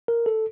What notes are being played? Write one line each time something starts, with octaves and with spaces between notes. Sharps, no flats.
A#4
A4